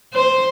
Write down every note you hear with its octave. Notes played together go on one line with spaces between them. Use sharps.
C5